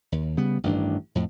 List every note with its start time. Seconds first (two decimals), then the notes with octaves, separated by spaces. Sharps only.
0.12 D#2
0.37 C#3 G3 B3
0.64 A1 G2 D#3 D4
1.15 F2 A2